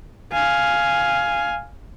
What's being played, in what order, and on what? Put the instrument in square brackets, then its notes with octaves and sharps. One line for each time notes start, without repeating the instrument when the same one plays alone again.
[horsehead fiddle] F5 G#5